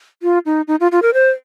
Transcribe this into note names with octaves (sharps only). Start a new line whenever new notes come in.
F4
D#4
D#4
F4
F4
A#4
C5